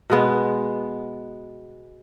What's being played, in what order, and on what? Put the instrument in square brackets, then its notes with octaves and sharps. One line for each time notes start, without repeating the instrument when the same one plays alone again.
[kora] B2 G#3 B3